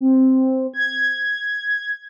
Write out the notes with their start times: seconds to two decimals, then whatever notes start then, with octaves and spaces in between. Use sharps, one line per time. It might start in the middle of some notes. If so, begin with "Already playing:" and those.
0.01 C4
0.74 G#6